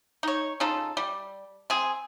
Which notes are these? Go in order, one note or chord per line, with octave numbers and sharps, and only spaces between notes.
D#4 C#5
C#3 D#4 F4 A4
G3
C4 G#4